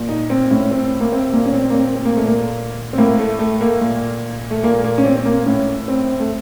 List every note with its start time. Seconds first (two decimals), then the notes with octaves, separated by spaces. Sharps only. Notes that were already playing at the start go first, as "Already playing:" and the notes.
Already playing: A#2
0.09 D#4
0.30 C4
0.51 A2 C#4
0.71 C4
1.00 A#3
1.12 C4
1.33 A#2 A#3
1.46 C#4
1.54 C4
1.70 A#3
1.74 C4
1.95 C4
2.05 A#3
2.15 A#2 A3
2.27 A#3
2.93 C4
2.98 A2 A#3
3.19 A3
3.39 A3
3.61 A#3
3.81 A#2
4.50 A3
4.63 A#2 A#3
4.84 A#3
4.98 C#4
5.05 C4
5.16 C4
5.25 A#3
5.46 A2 C#4
5.88 C4
6.20 A3